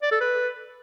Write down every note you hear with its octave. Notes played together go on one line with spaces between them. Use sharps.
D5
A4
B4